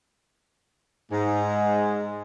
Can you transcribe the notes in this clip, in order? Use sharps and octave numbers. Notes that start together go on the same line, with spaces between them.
G#2 G#3